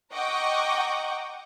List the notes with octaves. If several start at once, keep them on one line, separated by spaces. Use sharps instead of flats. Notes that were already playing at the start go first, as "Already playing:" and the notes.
D#5 F#5 G5 A#5 C#6 D6